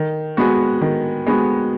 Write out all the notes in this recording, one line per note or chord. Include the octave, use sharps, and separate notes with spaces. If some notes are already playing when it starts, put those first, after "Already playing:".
Already playing: D#3
G#3 B3 F#4
D#3
G#3 B3 F#4